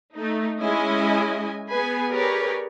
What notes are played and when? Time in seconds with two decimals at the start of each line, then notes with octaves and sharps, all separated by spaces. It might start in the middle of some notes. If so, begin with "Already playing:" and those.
0.16 A3 D#4
0.62 G#3 C#4 E4 D#5 G#5
1.70 B3 G#4 B4 G#5
2.13 G4 G#4 A#4 B4 C#5 D5